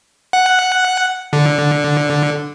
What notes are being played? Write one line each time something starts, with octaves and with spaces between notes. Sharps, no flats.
F#5
D3